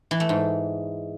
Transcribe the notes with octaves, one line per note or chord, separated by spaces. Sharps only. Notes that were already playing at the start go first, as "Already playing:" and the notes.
E3
A3
G#2